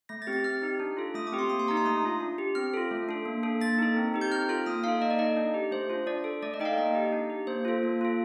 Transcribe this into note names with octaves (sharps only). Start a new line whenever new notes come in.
A3 A#6
A6
C4 G4
A6
C4 F6
D#4 G4
D4
F4 A4
A3 D#6
D6
C4 G4
C6
A#3 D#6
C6
D#4 G4 A#5
C6
A3 D#6
D4 F4
D4
G4
C4 F6
F4 A4
A3
D4 A4
A#3
D4 A4
A#3 A6
D#4 A4
C4
D#4 G4
G6
C4 F6
F4 A4 F6
A#3 D#6
D#4 A4 F5
A#3 D#5
D5
D#4 A4 D#5
D4
G4
A3 C5
D4 F4
D4 D5
A4
A3 D5
D#5
D#4 A4 G5
F5
A#3 D#5
D#4 G4
D4
G4
A#3 C5
F4 A4
A#3
F4 A4